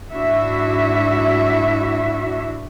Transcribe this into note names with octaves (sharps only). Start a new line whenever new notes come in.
G#2 D4 E4 F#4 E5